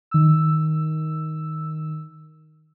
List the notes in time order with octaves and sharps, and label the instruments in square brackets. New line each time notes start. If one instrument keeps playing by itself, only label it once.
[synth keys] D#3 E6